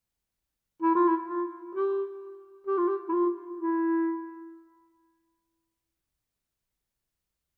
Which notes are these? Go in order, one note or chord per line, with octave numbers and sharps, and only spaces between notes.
E4
F4
E4
F4
G4
G4
F4
G4
E4
F4
E4